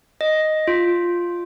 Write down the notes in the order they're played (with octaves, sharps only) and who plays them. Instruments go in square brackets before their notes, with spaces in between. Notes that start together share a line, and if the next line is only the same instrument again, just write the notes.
[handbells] D#5
F4